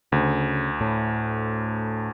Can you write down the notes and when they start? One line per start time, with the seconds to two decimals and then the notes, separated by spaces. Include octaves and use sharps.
0.12 D2 C#3
0.81 A2